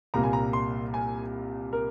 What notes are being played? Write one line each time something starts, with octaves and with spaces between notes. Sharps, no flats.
C2 A#2 G3 A#3 A#5
G#5
A#5
C6
G#5
A#4